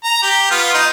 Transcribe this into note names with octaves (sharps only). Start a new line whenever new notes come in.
A#5
G4
B3 F4
D#4